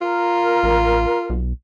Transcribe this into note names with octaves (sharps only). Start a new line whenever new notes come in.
F4 A#4
A1
B1